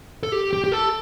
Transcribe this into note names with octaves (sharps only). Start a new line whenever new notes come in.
A4
G4
G4
G4
A4